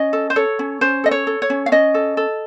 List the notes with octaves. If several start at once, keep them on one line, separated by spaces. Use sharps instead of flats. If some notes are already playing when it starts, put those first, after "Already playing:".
Already playing: C#4 D#5
A4
C5
A4 C#5
C#4
C#4 C5
A4 D#5
C#5
A4
C#5
C#4
F5
C#4 D#5
A4
A4